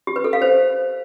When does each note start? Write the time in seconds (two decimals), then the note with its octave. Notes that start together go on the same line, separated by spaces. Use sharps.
0.07 G4
0.16 B4
0.24 A4
0.33 F5
0.42 C5